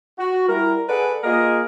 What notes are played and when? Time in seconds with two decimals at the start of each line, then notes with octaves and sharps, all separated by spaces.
0.19 F#4
0.49 G3 E4 A#4
0.88 G#4 A4 B4 D5 F#5
1.24 A#3 F4 G#4 A#4 D#5